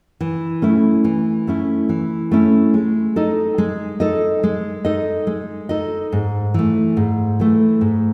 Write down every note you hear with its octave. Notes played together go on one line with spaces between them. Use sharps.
E3
A3 C#4 E4
E3
A3 C#4 E4
E3
A3 C#4 E4
G#3
D#4 A4 D#5
G#3
D#4 A4 D#5
G#3
D#4 A4 D#5
G#3
D#4 A4 D#5
G#2
E3 A3
G#2
E3 A3
G#2